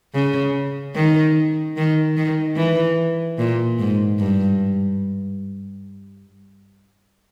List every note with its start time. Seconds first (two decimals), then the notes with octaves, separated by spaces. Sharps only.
0.14 C#3
0.95 D#3
1.77 D#3
2.17 D#3
2.57 E3
3.39 A#2
3.79 G#2
4.19 G2